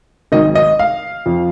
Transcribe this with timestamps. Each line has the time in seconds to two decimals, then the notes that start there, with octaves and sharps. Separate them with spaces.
0.32 G#1 G#2 D#3 F#3 D#5
0.55 D#5
0.79 F5
1.26 F2 F3